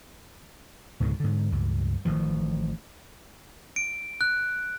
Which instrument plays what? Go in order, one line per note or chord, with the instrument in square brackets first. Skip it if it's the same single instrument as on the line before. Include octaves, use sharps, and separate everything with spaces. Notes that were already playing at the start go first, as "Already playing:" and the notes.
[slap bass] C#2 G#2 B2 D3
G#2 D3
C#2 G2
A1 D#3 F3
[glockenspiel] D7
F#6